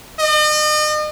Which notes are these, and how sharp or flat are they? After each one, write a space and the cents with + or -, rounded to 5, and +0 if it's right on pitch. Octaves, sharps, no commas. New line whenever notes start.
D#5 -40